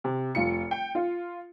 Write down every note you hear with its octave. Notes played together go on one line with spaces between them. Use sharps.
C3
F1 F4 C#7
G5
F4